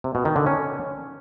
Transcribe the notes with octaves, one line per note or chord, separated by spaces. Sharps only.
C3
B2
D#3
D3
C#4